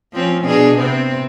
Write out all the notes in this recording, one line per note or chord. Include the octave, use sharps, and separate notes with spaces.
F3 C4 C#4
B2 D4 G#4
C3 B3 C4